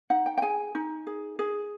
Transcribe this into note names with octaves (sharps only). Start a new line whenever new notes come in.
D#4 F#5
G5
G5
G#4 G#5
D#4
G#4
G#4